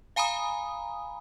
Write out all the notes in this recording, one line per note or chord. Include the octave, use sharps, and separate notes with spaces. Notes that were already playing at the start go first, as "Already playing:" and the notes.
F5 G#5 A#5 B5 D#6